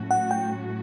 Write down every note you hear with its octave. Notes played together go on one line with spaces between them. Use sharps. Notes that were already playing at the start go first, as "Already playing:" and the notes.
Already playing: A2 F#3 C#4 F#4
F#5
G5